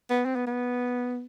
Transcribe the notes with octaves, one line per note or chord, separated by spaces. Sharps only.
B3
C4
B3
B3